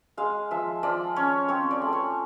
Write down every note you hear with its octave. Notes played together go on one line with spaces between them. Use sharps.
G#3 F5
F3 E5
F3 D5
C#4 C#5
C4 C#5
D5
A3
C#5